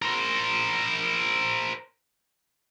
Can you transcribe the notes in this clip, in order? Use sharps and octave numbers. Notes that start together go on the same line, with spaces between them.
A#4 C5